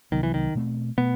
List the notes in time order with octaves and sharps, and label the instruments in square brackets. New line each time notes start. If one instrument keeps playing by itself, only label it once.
[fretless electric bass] C2 C3 F#3 B3 [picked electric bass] D#3
[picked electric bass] E3
D#3
[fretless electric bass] B2 A3 C4
[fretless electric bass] B2 A3 [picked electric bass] B3